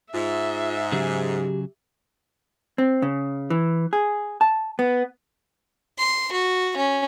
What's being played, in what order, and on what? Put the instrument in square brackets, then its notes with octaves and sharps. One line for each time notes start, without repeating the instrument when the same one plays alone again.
[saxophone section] G#2 [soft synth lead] F4 [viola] E5
[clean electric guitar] C#3 F#3 G#4 [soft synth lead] G4
[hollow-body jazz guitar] C4
C#3
E3
G#4
A5
B3
[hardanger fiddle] C6
F#4
C#4